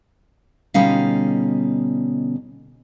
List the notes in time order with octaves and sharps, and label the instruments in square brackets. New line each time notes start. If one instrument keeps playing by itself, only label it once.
[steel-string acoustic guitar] B2 D3 G3 C#4 D#4 F5